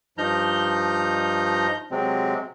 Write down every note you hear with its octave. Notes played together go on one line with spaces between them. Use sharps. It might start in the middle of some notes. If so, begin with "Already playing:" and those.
G2 F3 D#4 A#5 F6 G6
C3 F#3 G#3 C4